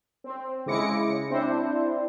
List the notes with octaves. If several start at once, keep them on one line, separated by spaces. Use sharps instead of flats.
C4
C#3 G#3 E4 D6 A#6 C#7
C4 D4 E4 C5